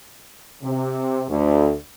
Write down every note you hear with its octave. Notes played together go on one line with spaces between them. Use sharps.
C3
D2